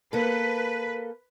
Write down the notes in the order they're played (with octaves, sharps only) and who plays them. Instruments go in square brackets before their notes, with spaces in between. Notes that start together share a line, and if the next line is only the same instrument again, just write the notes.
[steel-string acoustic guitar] A#3 A4 [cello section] B4